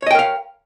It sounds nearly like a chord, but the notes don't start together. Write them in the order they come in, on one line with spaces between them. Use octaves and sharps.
C#5 D#5 G5 A#4 F5